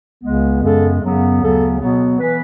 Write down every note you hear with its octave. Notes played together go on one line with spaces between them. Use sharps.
C#2 C#3 G#3 B3
F#2 C#3 G#3 B3 A4
F#2 C#3 F#3 B3
D2 C#3 F#3 B3 A4
B2 F#3 B3
E3 B3 B4